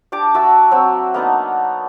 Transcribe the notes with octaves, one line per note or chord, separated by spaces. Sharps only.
D4 G4 D6
F#4 E5 A5 E6
F#3 C4 E6
A#3 B3 D4 D#4